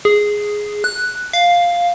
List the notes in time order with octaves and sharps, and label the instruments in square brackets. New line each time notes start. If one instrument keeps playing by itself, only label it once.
[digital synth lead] G#4
F#6
F5